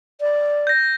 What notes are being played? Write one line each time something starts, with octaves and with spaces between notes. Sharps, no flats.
D5
G6 A#6